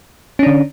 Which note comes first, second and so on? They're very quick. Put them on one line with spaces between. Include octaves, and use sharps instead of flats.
C#4 D4 D3